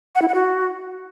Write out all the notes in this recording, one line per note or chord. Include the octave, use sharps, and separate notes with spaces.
F#5
E4
F#5
F#4